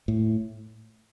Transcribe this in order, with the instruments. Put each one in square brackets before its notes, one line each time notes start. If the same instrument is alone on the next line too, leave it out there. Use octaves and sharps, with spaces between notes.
[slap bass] A2